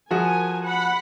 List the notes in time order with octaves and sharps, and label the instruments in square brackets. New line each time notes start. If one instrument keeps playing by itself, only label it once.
[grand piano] F3 F#4 G#4 [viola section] A#4 G#5
[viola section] F#5 B5